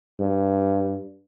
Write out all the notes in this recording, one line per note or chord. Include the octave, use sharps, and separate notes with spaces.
G2